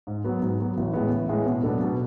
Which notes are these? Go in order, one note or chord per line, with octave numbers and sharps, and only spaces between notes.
G#2
F#3 B3
G#2
F#3 B3
A1
A2 G#3 B3
A1
A2 G#3 B3
B2
F#3 B3 D4 A4
B2